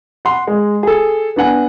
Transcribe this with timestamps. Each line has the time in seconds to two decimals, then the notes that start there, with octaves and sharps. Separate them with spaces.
0.25 F#5 C6
0.47 G#3
0.83 G#4 A4
1.36 B3 D4 F#5 G#5